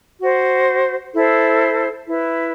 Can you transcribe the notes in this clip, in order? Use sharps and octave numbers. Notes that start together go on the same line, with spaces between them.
F#4 C5
E4 A4 C5
E4 B4